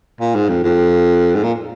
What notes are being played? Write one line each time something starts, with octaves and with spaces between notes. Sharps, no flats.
A#2
G#2
F2
F2
G#2
A#2